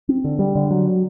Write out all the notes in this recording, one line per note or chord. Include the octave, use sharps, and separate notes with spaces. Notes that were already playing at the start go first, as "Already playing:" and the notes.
C4
D3
G3
D3
F#3